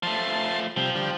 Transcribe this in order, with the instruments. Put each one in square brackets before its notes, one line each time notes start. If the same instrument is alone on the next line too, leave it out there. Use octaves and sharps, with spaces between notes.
[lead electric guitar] F3 A3 [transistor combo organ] A5 C6
[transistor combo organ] C3 G3 [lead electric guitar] F3
[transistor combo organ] D3 G3